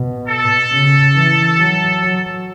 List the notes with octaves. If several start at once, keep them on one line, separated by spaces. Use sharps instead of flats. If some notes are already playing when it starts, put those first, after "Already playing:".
Already playing: B2
A4
C#3
E3
F#3
F#3